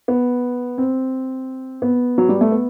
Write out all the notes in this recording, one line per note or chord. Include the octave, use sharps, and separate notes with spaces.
B3
C4
B3
F#3
G3
A3
B3